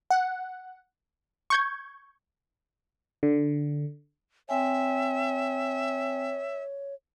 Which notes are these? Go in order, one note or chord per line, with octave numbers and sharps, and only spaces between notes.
F#5
C#6 G6 G#6
D3
C4 C#5 E5 G5 G#5